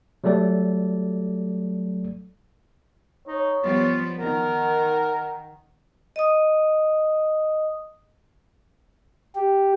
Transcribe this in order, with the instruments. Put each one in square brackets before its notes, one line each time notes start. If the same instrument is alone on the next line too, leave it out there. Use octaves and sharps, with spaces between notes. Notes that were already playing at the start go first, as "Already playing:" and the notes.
[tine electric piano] F#3 G3 A3 A4 D5
[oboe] D#4 [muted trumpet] C#5
[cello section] F3 G3 B3 [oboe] F4
[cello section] D#3 [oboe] A#4 [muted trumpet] F#5
[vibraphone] D#5 D#6
[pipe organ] G4